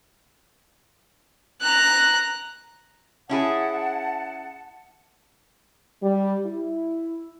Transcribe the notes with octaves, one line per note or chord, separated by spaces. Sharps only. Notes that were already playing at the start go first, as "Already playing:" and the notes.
A#5 F#6
C#4 E4 G#4 F#5 A5
G3
E4